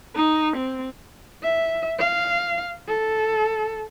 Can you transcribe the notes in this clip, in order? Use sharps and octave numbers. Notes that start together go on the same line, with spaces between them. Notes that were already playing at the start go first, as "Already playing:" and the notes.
D#4
C4
E5
F5
A4